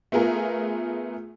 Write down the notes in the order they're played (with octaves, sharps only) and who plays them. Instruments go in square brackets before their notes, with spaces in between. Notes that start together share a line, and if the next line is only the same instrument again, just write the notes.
[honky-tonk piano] A3 B3 F4 G#4 A#4